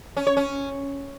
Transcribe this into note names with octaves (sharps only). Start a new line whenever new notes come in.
C#4
C#5
C#4